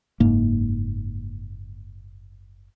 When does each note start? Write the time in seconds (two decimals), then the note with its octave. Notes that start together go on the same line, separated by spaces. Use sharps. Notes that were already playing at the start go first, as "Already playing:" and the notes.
0.20 F#1 G#2 A#3